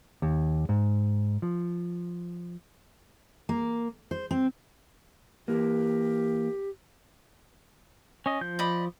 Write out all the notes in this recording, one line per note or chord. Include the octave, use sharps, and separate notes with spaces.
D#2
G#2
F3
A#3
C5
C4
E3 A#3 G4
C#4 D#5
F3 G6
D5 D#5 B5